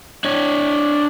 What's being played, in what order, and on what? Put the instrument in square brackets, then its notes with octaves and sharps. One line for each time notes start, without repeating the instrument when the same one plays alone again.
[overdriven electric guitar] D4 C#5